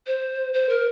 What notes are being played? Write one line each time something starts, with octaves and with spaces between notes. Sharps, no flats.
C5
C5
A#4